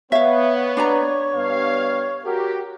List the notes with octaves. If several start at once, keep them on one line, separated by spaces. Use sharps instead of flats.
B3 C#5 E5 F5
D4 D5 A#5
G2 B3 F5
F#4 G4 A#4